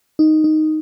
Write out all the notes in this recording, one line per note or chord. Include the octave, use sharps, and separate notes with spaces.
D#4
D#4